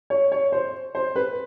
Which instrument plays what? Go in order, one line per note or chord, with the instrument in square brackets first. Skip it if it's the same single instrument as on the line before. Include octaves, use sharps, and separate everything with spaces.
[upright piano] C#5
C#5
C5
C5
B4